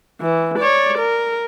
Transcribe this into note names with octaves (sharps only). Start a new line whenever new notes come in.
E3
C#5 D5
A#4